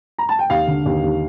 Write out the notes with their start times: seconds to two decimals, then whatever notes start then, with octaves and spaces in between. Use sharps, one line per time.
0.18 A#5
0.29 A5
0.39 G5
0.50 D#2 F5
0.68 D3
0.86 D#2
1.04 D#2